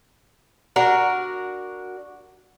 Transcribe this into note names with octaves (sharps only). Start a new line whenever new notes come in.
D4 F#4 A#4